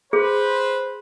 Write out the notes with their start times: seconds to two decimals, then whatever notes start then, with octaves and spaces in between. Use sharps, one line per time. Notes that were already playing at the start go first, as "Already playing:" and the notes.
0.13 G#4 B4 C5